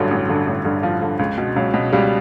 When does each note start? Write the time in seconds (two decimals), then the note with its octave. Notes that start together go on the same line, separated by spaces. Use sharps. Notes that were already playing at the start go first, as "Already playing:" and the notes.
Already playing: A1 G2 D3 F#3
0.11 A1
0.29 G2 D3
0.47 A1
0.65 G2 D3
0.83 A1 F3
1.02 G2 D3
1.19 C#2
1.38 B2
1.56 C#2 F#3
1.74 B2
1.92 C#2 G3